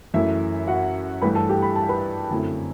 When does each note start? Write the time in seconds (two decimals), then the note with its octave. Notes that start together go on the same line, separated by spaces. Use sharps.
0.14 F#2 E3 A3 E4 E5
0.68 F#4 F#5
1.22 G2 E3 A3 B4 B5
1.35 A4 A5
1.49 G4 G5
1.62 B5
1.76 A5
1.89 B4 B5
2.30 F#2 D3 A3 C4 E4